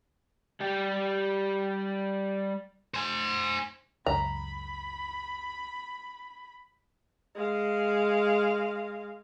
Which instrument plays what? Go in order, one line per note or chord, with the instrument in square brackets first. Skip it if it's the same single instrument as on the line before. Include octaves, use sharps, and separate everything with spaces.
[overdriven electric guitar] G3 G4
[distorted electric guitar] C5 G#5
[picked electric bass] C#2 F#2 [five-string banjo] A#5 [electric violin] B5
[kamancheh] G#3 F5